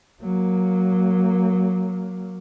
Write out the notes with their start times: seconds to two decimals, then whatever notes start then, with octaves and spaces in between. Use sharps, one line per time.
0.22 F#3 A#3